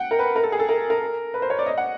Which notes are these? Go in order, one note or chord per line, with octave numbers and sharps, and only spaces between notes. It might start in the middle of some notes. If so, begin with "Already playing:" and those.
Already playing: F#5 G5
A#4
B4
A#4
A4
G#4
A4
A#4
A#4
B4
C5
C#5
D5
D#5
F#5